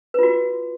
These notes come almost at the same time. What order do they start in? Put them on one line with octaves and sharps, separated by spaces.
B4 F4 F#4